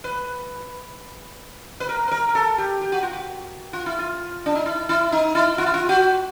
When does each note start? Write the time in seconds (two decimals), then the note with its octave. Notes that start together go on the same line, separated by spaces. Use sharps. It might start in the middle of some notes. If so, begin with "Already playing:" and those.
0.04 B4
1.80 B4
1.89 A#4
2.08 B4
2.11 A#4
2.29 A#4
2.35 A4
2.58 G4
2.81 G4
2.92 F#4
3.03 F4
3.13 F#4
3.73 F4
3.86 E4
3.99 F4
4.46 D4
4.55 D#4
4.66 E4
4.89 E4
5.12 D#4
5.35 E4
5.58 F4
5.66 E4
5.74 F4
5.89 F#4